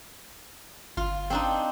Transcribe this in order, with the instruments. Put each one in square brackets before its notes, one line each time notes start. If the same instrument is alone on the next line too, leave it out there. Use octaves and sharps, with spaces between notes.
[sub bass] G1 [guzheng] F4
[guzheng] C4 D4 D#4